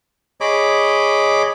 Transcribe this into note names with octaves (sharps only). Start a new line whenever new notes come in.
G#4 C#5 D#5 B5 D6